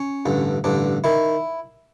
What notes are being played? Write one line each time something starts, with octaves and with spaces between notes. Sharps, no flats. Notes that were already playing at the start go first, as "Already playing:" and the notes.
Already playing: C#4
A1 G2 D3
A1 G2 D3 D4
D#3 E4